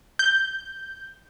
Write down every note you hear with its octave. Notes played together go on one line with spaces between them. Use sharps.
G6